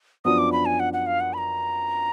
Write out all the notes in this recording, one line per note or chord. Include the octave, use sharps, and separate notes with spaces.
F#2 F3 B3 D4 D#6
D6
B5
G#5
F#5
F#5
F5
F#5
B5
A#5